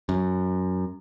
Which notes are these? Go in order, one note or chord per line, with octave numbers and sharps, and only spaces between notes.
F#2